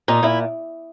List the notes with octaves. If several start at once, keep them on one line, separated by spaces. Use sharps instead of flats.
A#2 D#4
A#2 E4